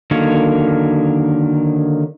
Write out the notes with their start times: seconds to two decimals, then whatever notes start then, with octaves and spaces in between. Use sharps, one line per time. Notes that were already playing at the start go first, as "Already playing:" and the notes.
0.11 D3 D#3 F#3 A#3 C#5